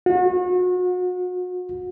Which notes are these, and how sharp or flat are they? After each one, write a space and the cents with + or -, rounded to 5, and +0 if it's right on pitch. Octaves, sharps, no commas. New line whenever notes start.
F#4 -35